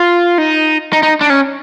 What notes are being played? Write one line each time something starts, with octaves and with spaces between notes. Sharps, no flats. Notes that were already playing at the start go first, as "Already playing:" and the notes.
Already playing: F4
D#4
D#4
D#4
D4
C#4